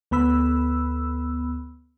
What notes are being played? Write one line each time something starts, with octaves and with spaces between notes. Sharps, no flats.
D2 B3 B5 E6